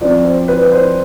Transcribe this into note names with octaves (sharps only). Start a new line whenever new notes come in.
F3 C4 F4 D5
C5
B4
C5